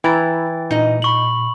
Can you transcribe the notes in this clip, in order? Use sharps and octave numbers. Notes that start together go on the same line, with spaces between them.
E3 E4 G5 A#5 A6
A#2 D#4 D#5
B5 C#6 F#7